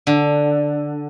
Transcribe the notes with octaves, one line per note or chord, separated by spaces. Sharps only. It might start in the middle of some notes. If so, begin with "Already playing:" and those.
D3